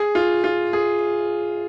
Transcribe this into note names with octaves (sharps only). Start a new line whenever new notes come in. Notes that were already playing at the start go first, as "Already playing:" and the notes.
Already playing: G#4
F4
F4
G#4